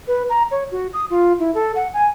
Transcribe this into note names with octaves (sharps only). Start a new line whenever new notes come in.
B4
A#5
C#5
F#4
D#6
F4
E4
A4
F#5
G#5